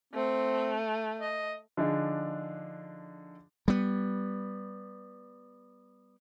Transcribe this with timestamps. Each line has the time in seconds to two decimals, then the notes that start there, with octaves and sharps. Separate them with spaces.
0.13 A3 C4
1.20 D#5
1.77 D3 F3 D4 D#4 G#4
3.68 G3 B3